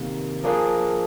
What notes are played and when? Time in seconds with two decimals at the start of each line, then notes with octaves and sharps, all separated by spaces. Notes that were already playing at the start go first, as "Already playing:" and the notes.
Already playing: C3 D#3 A#3
0.44 F3 A#3 D4 G#4